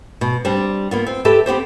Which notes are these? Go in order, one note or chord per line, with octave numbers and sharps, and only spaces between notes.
B2
G3 C4 D4
A#3 B3 F4
C4
G4 A4 B4 E5
B3 C4 G4 C5